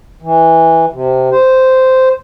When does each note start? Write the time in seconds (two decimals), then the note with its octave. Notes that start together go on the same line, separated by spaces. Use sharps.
0.22 E3
0.92 C3
1.31 C5